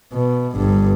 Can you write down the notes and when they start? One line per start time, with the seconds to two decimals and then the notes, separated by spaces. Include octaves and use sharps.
0.13 B2
0.56 G1 G2